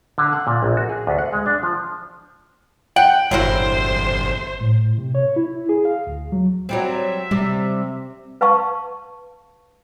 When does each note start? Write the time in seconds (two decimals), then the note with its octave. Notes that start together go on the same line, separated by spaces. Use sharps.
0.18 D3
0.33 F#5
0.47 A#2
0.63 A#1
0.77 F#4
0.89 G#4
1.07 D2
1.19 F#5
1.33 G#3
1.46 D4
1.63 F3
2.96 F#5 G5
3.31 G1 F#3 A#3 E4 C5
4.61 A2
4.98 C3
5.15 C#5
5.36 E4
5.69 G#4
5.85 F5
6.07 D2
6.32 F#3
6.69 F#3 G3 C4 E5
7.31 C3 G3
8.41 B4 F5 A5 C#6